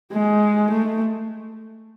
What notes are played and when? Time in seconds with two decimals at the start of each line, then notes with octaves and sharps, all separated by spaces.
0.12 G#3
0.71 A3